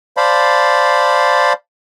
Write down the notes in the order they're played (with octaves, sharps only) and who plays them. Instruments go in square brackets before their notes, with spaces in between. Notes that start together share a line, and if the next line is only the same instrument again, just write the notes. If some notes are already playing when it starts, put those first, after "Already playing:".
[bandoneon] C5 D5 F5 A5 B5